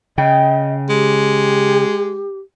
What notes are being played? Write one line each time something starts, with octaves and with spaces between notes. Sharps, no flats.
C#3 D#5 G5
G#3 G4